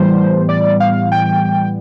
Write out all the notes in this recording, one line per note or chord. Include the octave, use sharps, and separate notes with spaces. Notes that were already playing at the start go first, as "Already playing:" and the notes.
Already playing: A2 E3 G3 B3 C5
D5
F5
G5